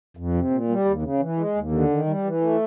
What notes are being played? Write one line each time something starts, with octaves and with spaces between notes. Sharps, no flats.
F2
C3
A#2
G3
D#2
C#3
E3
G#3
D#2
D3
D#3
G3
E3
A3